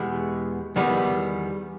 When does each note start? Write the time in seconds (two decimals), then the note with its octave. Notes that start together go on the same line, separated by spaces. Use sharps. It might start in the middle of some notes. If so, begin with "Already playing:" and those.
Already playing: E2 B2 G#3 B3 G4
0.76 E2 D#3 G3 B3